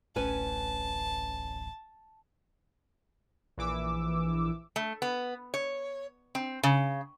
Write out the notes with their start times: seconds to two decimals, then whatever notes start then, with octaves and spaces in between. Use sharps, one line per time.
0.16 D1 A1 A2 C#4 B4 G#5 A5
3.58 A#1 E3 D6 E6
4.76 A3
5.02 B3
5.54 C#5
6.35 C4
6.63 C#3